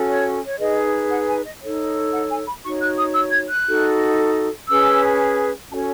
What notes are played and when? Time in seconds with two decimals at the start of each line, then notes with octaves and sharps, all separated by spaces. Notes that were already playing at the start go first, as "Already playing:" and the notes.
Already playing: C#4 F#4 A4
0.09 C#5
0.46 C#5
0.59 D#4 G#4 B4 D#5
1.11 F#5
1.27 G#5
1.45 D#5
1.61 D#4 A4 C#5
2.13 F#5
2.30 G#5
2.47 B5
2.64 D#4 F#4 C#5 C#6
2.81 F#6
2.98 D#6
3.15 E6
3.32 G#6
3.49 F#6
3.67 D#4 F#4 A4
4.68 C#4 G#4 B4 E6
5.71 C#4 F#4 A4 C#5 A5